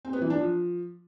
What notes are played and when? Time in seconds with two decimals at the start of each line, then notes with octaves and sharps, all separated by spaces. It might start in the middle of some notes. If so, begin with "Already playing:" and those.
0.05 C4
0.13 B3
0.22 E3
0.30 D4
0.39 F3